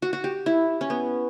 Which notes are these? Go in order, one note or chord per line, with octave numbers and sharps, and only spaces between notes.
F#4
F#4
G4
E4
C#4
B3